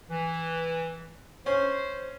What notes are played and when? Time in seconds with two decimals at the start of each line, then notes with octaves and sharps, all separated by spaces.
0.11 E3
1.46 C#4 C5